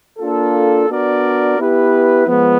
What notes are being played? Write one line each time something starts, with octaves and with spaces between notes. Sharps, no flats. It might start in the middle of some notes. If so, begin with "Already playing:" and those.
A#3 D4 F4 A4
B3 D4 F#4 A#4 D5
B3 E4 G4 B4
F3 G#3 B3